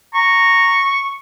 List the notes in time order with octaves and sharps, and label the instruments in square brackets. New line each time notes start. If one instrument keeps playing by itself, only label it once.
[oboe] A#5 [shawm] C#6